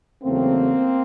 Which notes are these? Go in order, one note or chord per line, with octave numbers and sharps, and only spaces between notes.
E2 C#3 F#3 A3 A#3 C4